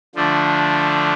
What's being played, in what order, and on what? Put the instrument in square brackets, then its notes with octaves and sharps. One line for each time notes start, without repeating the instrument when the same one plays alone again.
[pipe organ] D3 F3 A3 D4